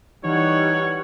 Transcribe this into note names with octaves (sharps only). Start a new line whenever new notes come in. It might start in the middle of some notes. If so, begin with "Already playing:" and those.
E3 G3 D#4 C#5 F#5